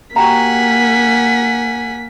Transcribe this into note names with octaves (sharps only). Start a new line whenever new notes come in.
A#3 F#4 G4 F#5 G#5 A#5 B6